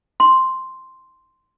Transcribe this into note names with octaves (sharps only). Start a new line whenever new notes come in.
C6